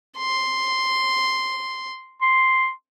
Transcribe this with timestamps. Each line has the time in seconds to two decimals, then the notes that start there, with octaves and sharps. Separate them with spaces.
0.18 C6
2.22 C6